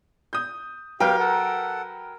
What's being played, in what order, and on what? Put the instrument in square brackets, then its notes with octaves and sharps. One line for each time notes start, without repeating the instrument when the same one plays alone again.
[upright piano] D#6 G6
[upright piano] F#3 B4 G5 [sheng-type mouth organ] G4 F5 [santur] A#4
[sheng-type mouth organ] A4 F#5